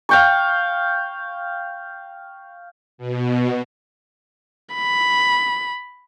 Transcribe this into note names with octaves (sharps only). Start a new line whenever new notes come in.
F5 G5 C#6
B2
B5